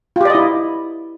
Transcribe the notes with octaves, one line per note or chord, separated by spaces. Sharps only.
E4 F4 G4 D5 D#5